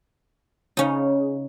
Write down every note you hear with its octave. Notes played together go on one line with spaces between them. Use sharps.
C#3 C#4 D#4